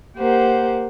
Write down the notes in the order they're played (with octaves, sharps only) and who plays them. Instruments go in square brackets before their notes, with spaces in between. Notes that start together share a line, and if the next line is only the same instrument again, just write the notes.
[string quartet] A#3 G4 A#4 C5 F#5